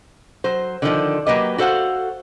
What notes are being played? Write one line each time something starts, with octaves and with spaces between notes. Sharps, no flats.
F#3 C5
D3 D#3 F3 D4
F#3 A#3 G4 B4 D#5
F#4 A4 C5 F5 F#5